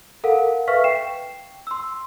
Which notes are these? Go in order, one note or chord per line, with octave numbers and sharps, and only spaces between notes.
A4 A#4 F5 F#5
B4 E5 F5 C#6 F6 B6
G5 C7 E7
C6 E6